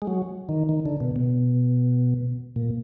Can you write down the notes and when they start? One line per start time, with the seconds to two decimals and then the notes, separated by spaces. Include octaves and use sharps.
0.02 G#3
0.07 F#3
0.49 D#3
0.69 D#3
0.86 D3
1.00 B2
1.16 B2
2.56 A#2